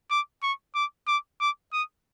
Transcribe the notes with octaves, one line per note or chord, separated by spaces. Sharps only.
D6
C#6
D6
D6
D6
D#6